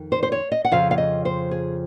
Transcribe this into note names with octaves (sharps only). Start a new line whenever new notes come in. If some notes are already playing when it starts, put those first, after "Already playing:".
Already playing: F2 D#3
C5
C5
C#5
D#5
F#5
F2 C#3 F3 F5
F5
D#5
C5
G#4